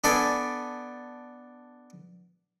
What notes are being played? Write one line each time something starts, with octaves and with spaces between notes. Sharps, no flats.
B3 D4 A4 D5 G#5